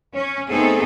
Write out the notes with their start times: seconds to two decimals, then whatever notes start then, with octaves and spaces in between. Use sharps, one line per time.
0.14 C#4
0.50 A3 B3 C4 D#4 G#4 A4